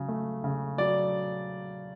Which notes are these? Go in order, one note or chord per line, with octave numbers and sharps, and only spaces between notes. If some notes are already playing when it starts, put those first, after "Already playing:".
Already playing: C#3 F#3
A3
C#3
F#3 D5